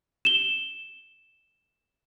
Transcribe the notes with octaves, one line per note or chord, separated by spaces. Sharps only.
E7 G7